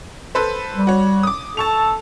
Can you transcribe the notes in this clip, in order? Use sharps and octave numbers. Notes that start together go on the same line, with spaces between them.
A4 B4 C5
G3
F#4 C#5
D6 D#6
A4 A5 C#6 F7